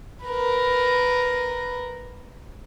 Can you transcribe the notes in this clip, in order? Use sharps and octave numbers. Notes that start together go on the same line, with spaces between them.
A#4 B4